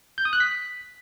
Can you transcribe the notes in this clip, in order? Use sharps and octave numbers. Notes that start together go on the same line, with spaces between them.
G6
D#6
F#6
B6